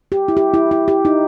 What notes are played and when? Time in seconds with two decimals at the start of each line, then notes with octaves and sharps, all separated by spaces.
0.12 G4
0.28 E4
0.37 G4
0.54 E4
0.71 E4
0.88 G4
1.05 D#4